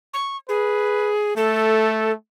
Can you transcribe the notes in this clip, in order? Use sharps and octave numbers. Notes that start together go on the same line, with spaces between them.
C#6
G#4 B4
A3 A4